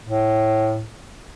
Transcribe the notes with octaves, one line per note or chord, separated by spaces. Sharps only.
A2